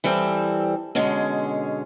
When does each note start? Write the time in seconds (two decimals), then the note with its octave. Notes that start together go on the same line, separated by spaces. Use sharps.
0.04 E3 G3 C4 A4
0.95 B2 D3 G#3 C#4